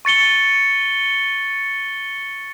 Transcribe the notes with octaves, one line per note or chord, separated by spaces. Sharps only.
C#6 A6 C#7 G7